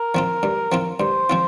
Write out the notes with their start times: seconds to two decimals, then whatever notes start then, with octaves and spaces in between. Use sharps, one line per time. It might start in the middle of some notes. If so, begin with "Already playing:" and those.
Already playing: A#4
0.15 F3 C4 F4
0.43 G2
0.72 F3 C4 F4
1.00 G2 C5
1.30 F3 C4 F4